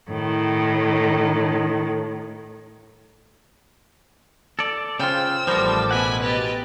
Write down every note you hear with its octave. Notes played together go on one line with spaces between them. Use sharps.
A2 D#3
A4 D5
C#3 F4 C5 G5 E6 F6
A1 F3 G3 B3 A4 A#4 C5 D6
B2 E4 F#5 G#5 B5
G4 B4 D#5 A6